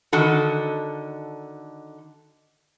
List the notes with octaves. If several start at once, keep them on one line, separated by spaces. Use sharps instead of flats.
D3 D#3 F#4 A4